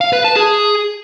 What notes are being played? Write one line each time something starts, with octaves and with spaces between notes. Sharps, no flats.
F5
B4
A5
G#4